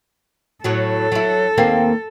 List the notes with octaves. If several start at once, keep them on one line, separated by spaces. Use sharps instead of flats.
A2 F#3 A4
F#3 E4
D#2 A#3 C4